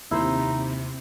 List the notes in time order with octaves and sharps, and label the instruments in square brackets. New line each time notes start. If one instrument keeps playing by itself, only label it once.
[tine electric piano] D#2 [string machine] C3 [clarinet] D#4 [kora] E4 C5